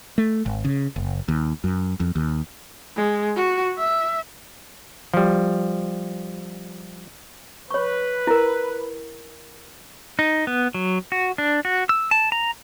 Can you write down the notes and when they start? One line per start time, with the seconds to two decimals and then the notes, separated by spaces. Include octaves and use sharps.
0.18 A3
0.46 G#1
0.65 C#3
0.96 F#1
1.28 D#2
1.64 F#2
2.00 F2
2.16 D#2
2.96 G#3
3.36 F#4
3.78 E5
5.14 F3 G3
7.71 B4 C#5 C#6
8.27 E4 A#4
10.19 D#4
10.47 B3
10.74 F#3
11.12 F#4
11.38 D4
11.65 F#4
11.89 E6
12.11 A5
12.32 A#5